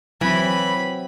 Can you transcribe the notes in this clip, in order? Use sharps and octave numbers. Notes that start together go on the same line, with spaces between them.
E3 F#3 C4 B5